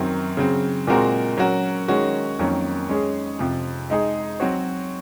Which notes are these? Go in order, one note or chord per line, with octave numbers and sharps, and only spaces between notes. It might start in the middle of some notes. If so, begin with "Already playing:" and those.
Already playing: F#2 D#3 F#3 C4
C#3 F#3 C4
A#2 G#3 C4 F#4 A#4
F#3 C#4 F#4 A#4
D#3 G#3 C#4 F#4
F2 D#3 F#3 A#3 C#4
G#3 C#4 G#4
F2 C3 F3
G#3 D#4 G#4
F#3 C4 F#4 C#5